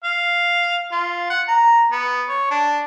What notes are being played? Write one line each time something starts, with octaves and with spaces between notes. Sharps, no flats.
F5
F4
F#5
A#5
B3
C#5
D4